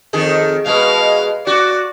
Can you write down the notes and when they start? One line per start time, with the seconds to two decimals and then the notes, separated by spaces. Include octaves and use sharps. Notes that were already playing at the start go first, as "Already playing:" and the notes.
0.13 F2 D#3 G#4
0.66 B2 G#3 B4 F5
1.47 F#4 D5